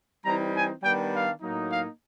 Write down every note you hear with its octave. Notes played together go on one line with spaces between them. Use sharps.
E3 G3 C4 D#4 A#5
G#5
D#3 G3 B3 D4 G5
F5
A2 F#3 A#3 D#4
F5